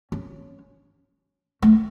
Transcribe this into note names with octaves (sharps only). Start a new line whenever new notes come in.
C#4
A3